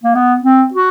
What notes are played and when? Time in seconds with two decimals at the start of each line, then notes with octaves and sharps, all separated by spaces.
0.03 A#3
0.15 B3
0.43 C4
0.73 F#4